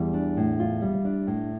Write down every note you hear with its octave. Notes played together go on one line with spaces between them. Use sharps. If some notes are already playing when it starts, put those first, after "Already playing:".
Already playing: E2 G3
D4
A2
F4
G3
D4
A2